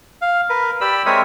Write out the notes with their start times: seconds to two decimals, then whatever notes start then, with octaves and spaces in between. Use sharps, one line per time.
0.22 F5
0.49 A#4 B4
0.81 G4 D5 B5 E6
1.06 G#3 C4 A#4 C#5 E5 D#6